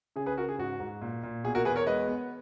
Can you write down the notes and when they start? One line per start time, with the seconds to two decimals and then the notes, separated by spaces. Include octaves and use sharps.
0.16 C#3 G#4
0.26 G#4 B4
0.37 C#3 F#4 A#4
0.49 G#4
0.58 G#2 F#4
0.80 G#2
1.01 A#2
1.23 A#2
1.44 B2 G#4
1.55 F#4 A#4
1.65 E2 G#4 B4
1.76 A#4 C#5
1.87 G#3 B4 D#5
2.08 B3